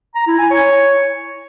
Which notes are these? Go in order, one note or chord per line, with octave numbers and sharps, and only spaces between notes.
A#5
E4
G#5
C#5